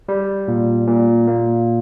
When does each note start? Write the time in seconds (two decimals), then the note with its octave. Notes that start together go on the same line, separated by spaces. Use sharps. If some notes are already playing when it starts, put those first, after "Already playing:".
0.09 G3
0.48 A#2
0.87 A#2
1.28 A#3